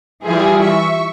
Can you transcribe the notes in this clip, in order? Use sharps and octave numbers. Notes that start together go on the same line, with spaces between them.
E3 G3 E4 F4 G4 G#4
E5 C#6